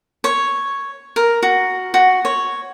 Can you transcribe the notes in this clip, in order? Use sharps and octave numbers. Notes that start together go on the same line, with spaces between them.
C#5
A#4
F#4
F#4
C#5